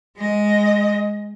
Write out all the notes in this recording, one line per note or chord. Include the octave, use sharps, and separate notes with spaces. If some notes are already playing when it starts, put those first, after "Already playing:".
G#3 D#5